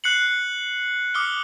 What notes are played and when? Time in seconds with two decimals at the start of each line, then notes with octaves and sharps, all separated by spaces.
0.04 F#6 C7 C#7 F#7
1.14 D6 D#6 F6 C#7 G7